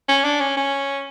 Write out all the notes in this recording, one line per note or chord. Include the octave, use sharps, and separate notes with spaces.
C#4
D4
C#4
C#4